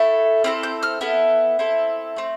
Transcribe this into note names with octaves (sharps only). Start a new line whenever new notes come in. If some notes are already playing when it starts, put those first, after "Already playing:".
Already playing: A3 E4 A4
C4 E4 A4 F6
G6
F6
B3 E4 A4
C4 E4 A4
A3 C4